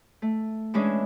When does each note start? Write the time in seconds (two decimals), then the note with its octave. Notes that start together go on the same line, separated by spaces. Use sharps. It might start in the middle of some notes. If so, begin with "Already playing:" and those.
0.22 A3
0.74 E3 G#3 C#4 D4 G#4